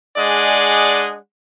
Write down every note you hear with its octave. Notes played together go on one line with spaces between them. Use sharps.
G#3 D4 G#4 D5 D#5 F#5